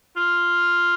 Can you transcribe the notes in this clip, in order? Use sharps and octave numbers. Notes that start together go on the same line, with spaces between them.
F4